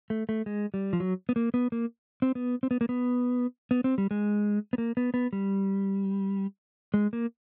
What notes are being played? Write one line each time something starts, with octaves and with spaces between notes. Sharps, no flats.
A3
A3
G#3
G3
F3
F#3
B3
A#3
B3
A#3
C4
B3
C4
B3
A#3
B3
B3
C4
G3
G#3
B3
A#3
B3
B3
G3
G#3
A#3